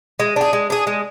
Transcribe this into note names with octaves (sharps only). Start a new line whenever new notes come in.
G#3
D4 G#4
G#3
D4 G#4
G#3